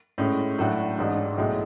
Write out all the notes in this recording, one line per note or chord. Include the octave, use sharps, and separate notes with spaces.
A2 G#3 C#4
A2 F#3 A3 D4 F#4
A1 G#2 G#3 D4
B1 A2 G#3